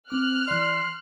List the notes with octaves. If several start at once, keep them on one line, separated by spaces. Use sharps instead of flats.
C4 D6 F6 F#6
E3 D5 C6